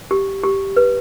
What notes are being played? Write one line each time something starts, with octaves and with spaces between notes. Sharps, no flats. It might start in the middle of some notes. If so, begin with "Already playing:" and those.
G4
G4
B4